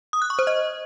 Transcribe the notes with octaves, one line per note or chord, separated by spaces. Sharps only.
D#6
F#6
C#6
C5
D#5